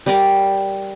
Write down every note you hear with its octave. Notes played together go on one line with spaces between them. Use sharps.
G3 G4 A#4 D5